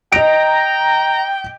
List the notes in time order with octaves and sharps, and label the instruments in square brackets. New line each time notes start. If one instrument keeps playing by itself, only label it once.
[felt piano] D#5 D7 [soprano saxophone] G5 [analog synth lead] A#5